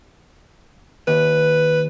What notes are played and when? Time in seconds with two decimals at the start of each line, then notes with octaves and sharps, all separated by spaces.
1.08 D#2 B4